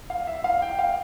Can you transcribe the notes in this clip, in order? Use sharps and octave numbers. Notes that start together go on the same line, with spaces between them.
F5
E5
F5
G5
F5